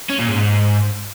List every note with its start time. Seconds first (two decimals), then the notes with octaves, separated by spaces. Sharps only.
0.10 C#4
0.19 A#2
0.29 G#2